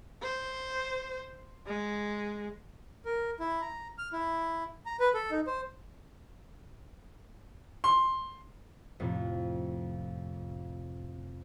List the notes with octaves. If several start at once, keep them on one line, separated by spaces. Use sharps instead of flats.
C5
G#3
A#4
E4
A#5
F6
E4
A#5
B4
A4
D#4
C5
C6
F2 A2 C3